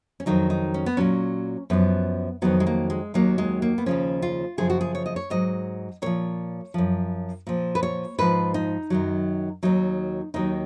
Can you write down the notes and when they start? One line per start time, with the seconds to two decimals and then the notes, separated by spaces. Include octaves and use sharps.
0.20 C#4
0.26 F2 D#3 F#3 D#4
0.50 D#4
0.74 C#4
0.86 B3
0.97 A#2 F#3 C#4
1.70 F#2 F3 B3
2.42 F2 D#3 F#3 B3
2.60 G#3
2.67 A#3
2.90 G#3
3.14 D#2 D#3 F#3 A#3
3.38 G#3
3.62 A#3
3.78 B3
3.86 D#2 C#3 F3 C#4
4.22 F4
4.58 F#2 C#3 F3 G#4
4.70 F#4
4.81 G#4
4.95 C#5
5.06 D#5
5.16 C#5
5.30 G#2 F#3 D#5
6.02 A#2 F3 C#5
6.74 F#2 F3
7.47 A#2 F3
7.75 B4
7.83 C#5
8.18 G#2 F3 B4
8.54 D#4
8.90 F#2 D#3 F#3
9.63 D#2 D#3 F#3 D#4
10.34 D#2 D#3 F#3 D#4